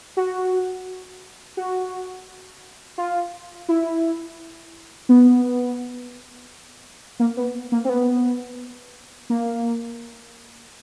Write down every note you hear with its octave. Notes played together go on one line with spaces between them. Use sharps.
F#4
F#4
F4
E4
B3
A#3
B3
A#3
C4
B3
A#3